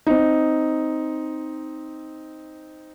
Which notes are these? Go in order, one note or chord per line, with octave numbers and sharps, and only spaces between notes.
C4 D#4